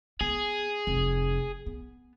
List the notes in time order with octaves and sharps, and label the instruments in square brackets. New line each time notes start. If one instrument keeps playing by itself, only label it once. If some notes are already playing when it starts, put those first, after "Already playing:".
[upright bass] B3 [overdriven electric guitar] G#4
[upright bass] F1
B3